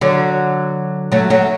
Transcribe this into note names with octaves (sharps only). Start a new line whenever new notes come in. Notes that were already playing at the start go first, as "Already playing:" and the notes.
D3 F#3
F#3 A3
F#3 A3